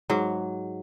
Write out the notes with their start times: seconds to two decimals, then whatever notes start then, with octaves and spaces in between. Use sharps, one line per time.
0.10 G#2 F#3